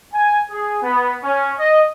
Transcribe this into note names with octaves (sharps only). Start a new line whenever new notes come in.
G#5
G#4
B3
C#4
D#5